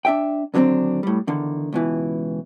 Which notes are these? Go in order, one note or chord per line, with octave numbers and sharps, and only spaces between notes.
D4 E5 G5
D#2 D3 F#3 A#3 C4 D4
A2 G3
E2 D3 D#3
C#2 B2 E3